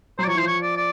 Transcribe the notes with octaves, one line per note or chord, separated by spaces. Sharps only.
F#3 C5
D5
F3 C#5
E3 C5
F3 C#5
D5
D5